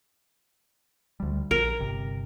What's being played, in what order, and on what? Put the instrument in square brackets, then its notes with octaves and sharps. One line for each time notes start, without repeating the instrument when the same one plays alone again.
[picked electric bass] D2 G3
[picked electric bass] A#1 [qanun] A#4
[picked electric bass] G1 C3